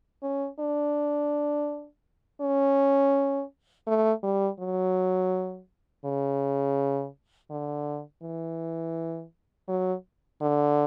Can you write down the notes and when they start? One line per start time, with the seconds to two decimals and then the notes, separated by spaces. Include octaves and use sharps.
0.23 C#4
0.60 D4
2.41 C#4
3.87 A3
4.23 G3
4.60 F#3
6.05 C#3
7.50 D3
8.23 E3
9.68 F#3
10.41 D3